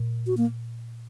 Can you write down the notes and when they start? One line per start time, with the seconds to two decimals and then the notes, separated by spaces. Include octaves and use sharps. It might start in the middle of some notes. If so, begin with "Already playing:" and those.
Already playing: A#2
0.27 F#4
0.37 A#3